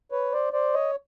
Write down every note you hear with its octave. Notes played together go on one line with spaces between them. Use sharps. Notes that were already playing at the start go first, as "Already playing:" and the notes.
B4 C#5
C5 D5
C5 D5
C#5 D#5